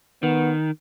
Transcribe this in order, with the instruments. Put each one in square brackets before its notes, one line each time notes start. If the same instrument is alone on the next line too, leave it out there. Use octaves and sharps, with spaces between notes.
[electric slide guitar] D#3 [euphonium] B3